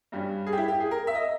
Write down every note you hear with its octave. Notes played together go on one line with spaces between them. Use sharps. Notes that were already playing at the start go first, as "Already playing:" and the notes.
G2 G3 C#4
G#4
G4
E4
G4
G#4
A#4
E5
D#5